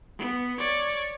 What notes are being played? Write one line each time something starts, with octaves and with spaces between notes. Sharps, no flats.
B3
C#5 D5